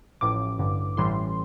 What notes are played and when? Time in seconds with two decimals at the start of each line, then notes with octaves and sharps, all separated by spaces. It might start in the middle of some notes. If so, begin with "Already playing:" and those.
0.21 A1 A2 F3 D6
0.59 A1 G2 D3
0.97 A1 A2 E3 G3 C6